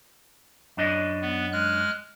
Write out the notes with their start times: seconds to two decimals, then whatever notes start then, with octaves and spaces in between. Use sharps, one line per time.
0.77 F#2 D4 D#5
1.22 B3
1.52 G#3 F6 F#6